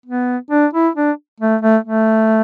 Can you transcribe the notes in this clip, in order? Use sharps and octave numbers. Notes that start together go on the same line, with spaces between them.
B3
D4
E4
D4
A3
A3
A3